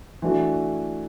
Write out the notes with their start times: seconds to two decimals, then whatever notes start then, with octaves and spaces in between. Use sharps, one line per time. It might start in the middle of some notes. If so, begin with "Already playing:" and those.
0.22 E3 A3 D4 F#4